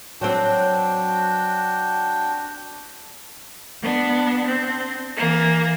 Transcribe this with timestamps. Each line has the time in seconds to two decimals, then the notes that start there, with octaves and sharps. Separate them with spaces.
0.21 F#3 C4 D4 F#4 G5
3.80 B3 D4
4.46 C4
5.16 E3 A#3